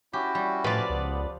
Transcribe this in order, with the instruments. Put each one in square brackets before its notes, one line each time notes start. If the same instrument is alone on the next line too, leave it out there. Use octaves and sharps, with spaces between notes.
[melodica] C#4 E4 F#4 [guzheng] G4
[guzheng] G3
[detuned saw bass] A2 [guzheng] F3 [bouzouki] B4 D5
[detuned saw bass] C#2 [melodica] B3